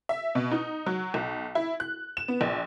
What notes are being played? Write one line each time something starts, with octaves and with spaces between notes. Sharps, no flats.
E5
B2
D#4
F#3
B1
E4
F#6
E7
B3
A#1